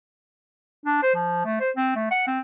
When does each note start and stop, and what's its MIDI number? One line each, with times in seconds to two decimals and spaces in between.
0.86 0.98 62
1.03 1.15 72
1.15 1.41 53
1.45 1.57 57
1.61 1.71 72
1.76 1.91 60
1.96 2.07 57
2.11 2.25 78
2.27 2.40 60